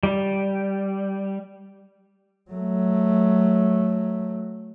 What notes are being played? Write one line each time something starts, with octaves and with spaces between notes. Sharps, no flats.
G3
F#3 A3